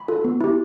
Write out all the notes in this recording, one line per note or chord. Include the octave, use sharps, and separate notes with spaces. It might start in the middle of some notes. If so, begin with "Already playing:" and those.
Already playing: B5
F4 A4
B3
E4 G4